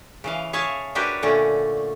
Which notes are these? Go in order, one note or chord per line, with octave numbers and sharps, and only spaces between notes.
C#3 E3 F5
G#4 C#5 E5 F5 A5
D4 F#4 G4 A#4 B4 C#5
A#2 D3 A3 C#4